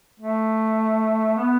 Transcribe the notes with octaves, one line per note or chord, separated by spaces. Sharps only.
A3
B3